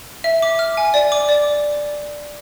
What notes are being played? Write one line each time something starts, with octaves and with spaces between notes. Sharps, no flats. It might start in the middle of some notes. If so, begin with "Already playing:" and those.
E5
D6
F6
G#5
D5
D6
D5